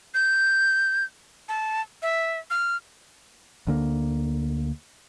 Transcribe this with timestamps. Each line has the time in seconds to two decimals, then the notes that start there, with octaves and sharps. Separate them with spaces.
0.14 G6
1.49 A5
2.02 E5
2.50 F6
3.67 D2 D3 A#3